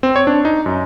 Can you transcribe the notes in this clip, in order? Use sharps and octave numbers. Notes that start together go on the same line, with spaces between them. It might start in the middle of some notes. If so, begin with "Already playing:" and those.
C4
C#5
D4
D#4
F#2